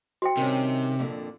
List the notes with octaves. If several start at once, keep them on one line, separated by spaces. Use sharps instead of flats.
F#4 C5 G5
C3 D#3 G3 C#4
F2 A#2 D3